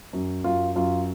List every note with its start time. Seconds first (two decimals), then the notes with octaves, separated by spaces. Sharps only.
0.13 F#2
0.44 F#2 F4
0.76 F#2 F4